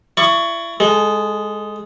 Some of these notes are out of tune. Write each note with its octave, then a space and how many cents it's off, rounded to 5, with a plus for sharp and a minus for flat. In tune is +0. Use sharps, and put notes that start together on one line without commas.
E4 +35 D5 +30 C#6 +10
G#3 +0 A4 -25